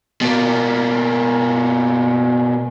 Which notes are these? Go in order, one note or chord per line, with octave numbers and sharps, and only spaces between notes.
B2 A#3